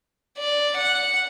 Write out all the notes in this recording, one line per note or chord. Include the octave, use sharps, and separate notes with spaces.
D5
F#5